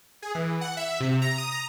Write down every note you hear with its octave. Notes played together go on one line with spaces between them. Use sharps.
G#4
E3
F#5
E5
C3
A#5
D#6
A#5